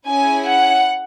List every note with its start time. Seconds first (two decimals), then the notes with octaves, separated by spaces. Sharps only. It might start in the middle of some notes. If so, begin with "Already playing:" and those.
0.08 C#4 E4 G#4 G#5
0.48 F#5